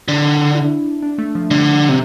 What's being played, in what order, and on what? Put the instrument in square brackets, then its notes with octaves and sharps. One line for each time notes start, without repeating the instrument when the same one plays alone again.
[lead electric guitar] D3 [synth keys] D4
[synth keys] E4
D4
A3
F3
[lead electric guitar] D3 [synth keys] G3
[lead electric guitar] C3